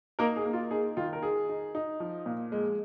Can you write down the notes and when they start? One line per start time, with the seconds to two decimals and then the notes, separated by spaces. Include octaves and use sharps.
0.19 A#3 D#4 A#4
0.36 G#4
0.46 A#3
0.53 F4
0.71 D#4 G#4
0.97 D#3 F4
1.13 A#4
1.22 D#4 G#4
1.49 D#4
1.75 D#4
2.00 F3
2.26 A#2
2.52 G#3